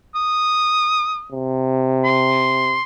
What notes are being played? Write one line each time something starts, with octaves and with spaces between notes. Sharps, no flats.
D#6
C3
C6